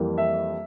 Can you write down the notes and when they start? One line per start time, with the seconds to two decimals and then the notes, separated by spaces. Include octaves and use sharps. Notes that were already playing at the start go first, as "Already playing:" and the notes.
Already playing: F2 E3 G3 A#3
0.18 E5